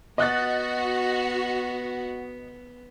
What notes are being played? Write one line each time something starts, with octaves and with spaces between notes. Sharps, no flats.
B3 F#4 D#5 F#6 A6